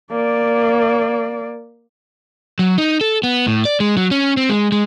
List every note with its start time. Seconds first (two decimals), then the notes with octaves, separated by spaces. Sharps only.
0.12 A#3 D5
2.59 F#3
2.78 D#4
3.01 A4
3.23 B3
3.47 A2
3.65 D5
3.80 G#3
3.97 F#3
4.11 C#4
4.37 C4
4.49 G#3
4.72 G#3